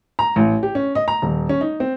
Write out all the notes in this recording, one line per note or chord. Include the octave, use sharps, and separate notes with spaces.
A#5
A1
G4
C#4
D#5
A#5
D#1
C#4
D#4
C4